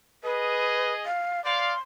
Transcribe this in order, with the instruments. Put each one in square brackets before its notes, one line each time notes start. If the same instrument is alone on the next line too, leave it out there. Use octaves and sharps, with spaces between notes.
[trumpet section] G#4 D#5 [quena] B4
[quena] F5
[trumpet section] D5 F5 [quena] C6